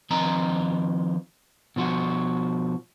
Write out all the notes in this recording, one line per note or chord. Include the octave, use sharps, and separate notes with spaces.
D#3 F3 C4 D#5 A#5
B2 F3 F#4